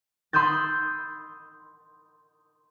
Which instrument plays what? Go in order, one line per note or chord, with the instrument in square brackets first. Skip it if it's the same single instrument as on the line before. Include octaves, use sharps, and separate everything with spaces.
[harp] B5 C6 D#6 E6 G6 A6